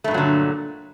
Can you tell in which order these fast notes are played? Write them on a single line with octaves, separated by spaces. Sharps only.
A3 G2 A#2 F#3 D3